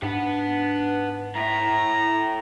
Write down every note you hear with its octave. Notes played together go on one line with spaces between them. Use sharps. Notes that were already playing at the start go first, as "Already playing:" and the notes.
G#2 D4 B4 F#5
A2 E5 A#5